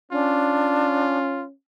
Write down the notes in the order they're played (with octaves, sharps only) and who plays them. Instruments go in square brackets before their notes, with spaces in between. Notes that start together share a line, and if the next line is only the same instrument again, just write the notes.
[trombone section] C#4 [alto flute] D4 [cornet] F4